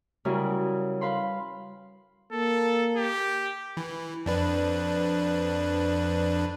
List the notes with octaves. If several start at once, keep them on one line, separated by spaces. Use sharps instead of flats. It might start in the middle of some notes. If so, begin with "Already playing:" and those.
C#3 E3 F#3 G3 A#4
B4 F5 B5 C6
A#3 A4
G4
E3
F2 D4 B4